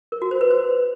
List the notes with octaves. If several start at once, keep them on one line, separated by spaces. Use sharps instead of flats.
A#4
F#4
C5
B4
C5